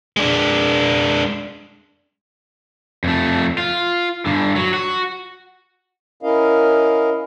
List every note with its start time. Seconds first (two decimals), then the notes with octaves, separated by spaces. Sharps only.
0.17 G#3 D4
3.04 F2 A3
3.58 F4
4.26 G2 D3
4.56 F#3
4.74 F#4
6.23 C#4 E4 A#4 D#5 F5